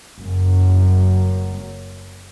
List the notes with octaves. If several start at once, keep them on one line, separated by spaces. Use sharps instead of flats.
F#1 F#2